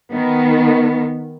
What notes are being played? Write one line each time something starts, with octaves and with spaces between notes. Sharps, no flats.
D#3 B3